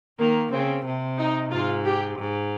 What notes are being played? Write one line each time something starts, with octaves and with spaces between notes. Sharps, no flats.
D#3 A#3
C#3 C4
C3
D#4
G#2 F4
G4
G#2